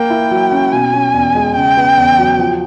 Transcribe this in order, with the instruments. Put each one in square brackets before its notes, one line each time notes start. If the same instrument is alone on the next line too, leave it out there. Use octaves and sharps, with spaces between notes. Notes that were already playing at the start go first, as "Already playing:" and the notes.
Already playing: [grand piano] A#3 [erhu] G5
[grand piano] E4
F#3
C#4
[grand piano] B2 [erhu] G#5
[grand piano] C#4
E2
G#3
[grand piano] C#3 [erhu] G5
[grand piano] B3
E2
F#3
F3